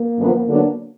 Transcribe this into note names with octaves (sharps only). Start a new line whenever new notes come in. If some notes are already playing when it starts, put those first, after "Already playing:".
Already playing: A#3
F#2 D3 F3 B3
D3 F#3 B3 D4